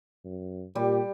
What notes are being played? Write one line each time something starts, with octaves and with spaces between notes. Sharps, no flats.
F#2
A#2 G3 G4